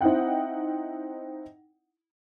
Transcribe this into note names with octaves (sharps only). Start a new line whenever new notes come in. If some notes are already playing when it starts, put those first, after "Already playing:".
C4 D#4 E4 F#5 G5